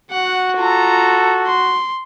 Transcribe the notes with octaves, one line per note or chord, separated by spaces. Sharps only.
F#4 F#5
F4 A4 A#5
C6